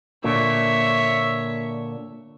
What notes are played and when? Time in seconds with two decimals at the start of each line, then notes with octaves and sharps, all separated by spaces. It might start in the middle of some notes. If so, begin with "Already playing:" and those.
0.24 A#2 D3 C#5 E5